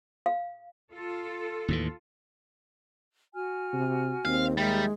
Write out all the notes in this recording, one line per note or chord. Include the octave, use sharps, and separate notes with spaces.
F5
F4 A4
D#2 A2 E3
F#4 G#5 F6
C3
D#2 C4 F5
G3 G#3 D#4 A#4 E5